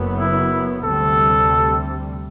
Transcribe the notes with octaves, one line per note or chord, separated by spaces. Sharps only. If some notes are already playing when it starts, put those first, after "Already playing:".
Already playing: F#1 F#2 F#3 B3
E4
D2 C3 G3 A4